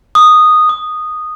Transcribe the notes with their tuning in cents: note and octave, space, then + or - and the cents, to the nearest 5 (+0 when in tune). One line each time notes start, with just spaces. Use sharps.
D#6 -10
D#6 -10